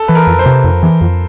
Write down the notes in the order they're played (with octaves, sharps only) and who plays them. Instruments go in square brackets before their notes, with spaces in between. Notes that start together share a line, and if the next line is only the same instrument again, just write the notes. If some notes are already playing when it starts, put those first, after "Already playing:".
Already playing: [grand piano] A4
[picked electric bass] E3 [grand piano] B4
[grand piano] A#4
[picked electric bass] F2
[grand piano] C5
[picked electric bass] C3
F2
E3
F2